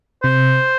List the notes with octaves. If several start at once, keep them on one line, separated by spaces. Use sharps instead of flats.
C3 C5